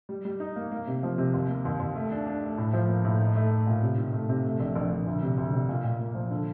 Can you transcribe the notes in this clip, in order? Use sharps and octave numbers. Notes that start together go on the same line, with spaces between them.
G3
G3
D#4
A#3
A#3
C3
F3
C3
D#2
A#3
D#2
D#2
A3
D4
D4
A3
A2
F3
A#3
A2
D#4
A3
A3
A#2
C3
D#3
A3
C3
A3
A#1
A#1
A#1
D2
C3
D2
C3
A#2
A#2
A#3
F3
D3